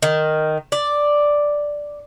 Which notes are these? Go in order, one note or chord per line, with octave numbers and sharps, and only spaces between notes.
D#3
D5